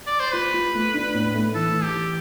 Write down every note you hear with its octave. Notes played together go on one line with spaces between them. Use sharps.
D5
C5
F4 B4
F4
A3
D4
A2
A3
E3 A4
E3
G4
E3